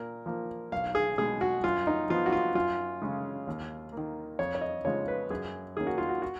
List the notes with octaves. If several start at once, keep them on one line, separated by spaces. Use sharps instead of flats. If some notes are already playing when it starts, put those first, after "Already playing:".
Already playing: A#2 A#4
F3 A#3
B1 F5
G#4
B2 G#3 G#4
F#4
F#2 F4
D#4
F3 B3 F4
F#4
F4
F#2 F4
C#3 G#3 C#4
D#2
D#3 A#3
F2 C#5
C#5
D#5
C#3 F3 G#3 C#5
B4
F#2 G#4
D#3 A#3 C#4 G#4
F#4
F4
F#4
F#4